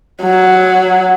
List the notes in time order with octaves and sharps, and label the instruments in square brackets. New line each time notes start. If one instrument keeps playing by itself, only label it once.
[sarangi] F#3